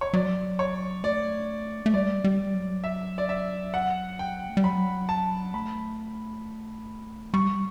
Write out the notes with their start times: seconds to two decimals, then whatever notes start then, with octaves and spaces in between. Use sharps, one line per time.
0.01 C#5
0.13 F#3 D5
0.59 C#5
1.03 A3 D5
1.86 A3
1.94 G3 D5
2.24 G3
2.54 F#3
2.84 E5
3.18 D5
3.29 E5
3.74 F#5
4.19 G5
4.49 A3
4.57 G3
4.64 F#3 B5
5.09 A5
5.54 A3 B5
7.34 G3 C#6